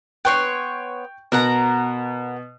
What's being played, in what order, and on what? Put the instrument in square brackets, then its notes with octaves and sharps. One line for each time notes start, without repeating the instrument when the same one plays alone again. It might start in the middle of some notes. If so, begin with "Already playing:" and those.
[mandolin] B3 C#5 C6 [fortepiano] G5 C#6
[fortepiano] B2 [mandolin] A#4 F#5 A#5